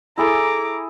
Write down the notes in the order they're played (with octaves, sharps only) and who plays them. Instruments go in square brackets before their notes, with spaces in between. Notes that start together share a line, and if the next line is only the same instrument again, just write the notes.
[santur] E4 G#4 A4 [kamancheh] A#5 D6